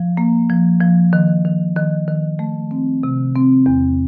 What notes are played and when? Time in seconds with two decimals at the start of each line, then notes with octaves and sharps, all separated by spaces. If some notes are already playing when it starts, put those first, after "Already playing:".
Already playing: F3
0.17 A#3
0.50 F3
0.81 F3
1.13 D#3
1.45 D#3
1.76 D#3
2.08 D#3
2.39 A3
2.71 C4
3.03 C3
3.36 C4
3.66 E2